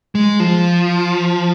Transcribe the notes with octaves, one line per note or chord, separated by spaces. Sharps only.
G#3
F3